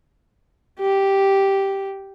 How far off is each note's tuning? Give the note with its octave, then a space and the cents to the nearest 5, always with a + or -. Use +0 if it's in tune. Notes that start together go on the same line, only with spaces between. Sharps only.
G4 -5